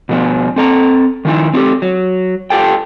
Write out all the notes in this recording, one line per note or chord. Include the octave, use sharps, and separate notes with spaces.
B2 F3 B3
C4 A4 A#5
D#3 F3 D#4 E4
C4 D#4 F4 G4 A4
F#3
F4 G4 A4 G5